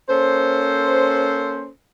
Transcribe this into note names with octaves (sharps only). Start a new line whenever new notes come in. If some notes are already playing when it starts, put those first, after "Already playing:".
A#3 C#4 A4 C5